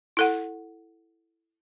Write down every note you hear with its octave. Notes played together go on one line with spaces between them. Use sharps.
E4 A4 F#5